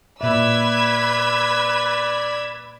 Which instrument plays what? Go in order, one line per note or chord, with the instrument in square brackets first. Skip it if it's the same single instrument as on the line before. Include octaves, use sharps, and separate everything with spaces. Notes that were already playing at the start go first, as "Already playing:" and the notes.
[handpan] A#2 E5 [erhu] B4 [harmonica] D5 [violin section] E6 G#6 B6